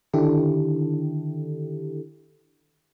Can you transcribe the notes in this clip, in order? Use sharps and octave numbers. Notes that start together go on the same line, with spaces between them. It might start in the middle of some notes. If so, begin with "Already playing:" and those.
D3 D#3 D4 E4 G4 A4